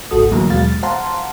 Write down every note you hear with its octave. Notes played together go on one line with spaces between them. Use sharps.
G#1 C#2 A2 F#4 A4 D#6
A2 D3 E3 F#3 A#3 A#5
D#2 B2 F#3 G#3 F5 A6
C5 F5 F#5 A5 A#5 C6